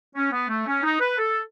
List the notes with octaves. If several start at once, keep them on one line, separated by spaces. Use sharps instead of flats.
C#4
B3
A3
C#4
D#4
B4
A4